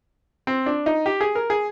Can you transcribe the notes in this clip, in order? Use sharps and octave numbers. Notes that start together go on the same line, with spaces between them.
C4
D4
D#4
G4
G#4
A#4
G#4